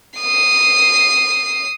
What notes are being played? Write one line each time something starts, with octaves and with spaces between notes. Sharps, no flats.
D#6 C7